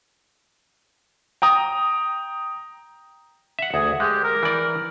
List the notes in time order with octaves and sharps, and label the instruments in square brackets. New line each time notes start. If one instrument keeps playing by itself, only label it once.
[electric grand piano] G5 A#5 D#6
[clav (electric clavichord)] E5 F#5
[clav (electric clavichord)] D2 [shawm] G#4
[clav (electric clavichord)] G#3 [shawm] G4
[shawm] A#4
[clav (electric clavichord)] E3 D5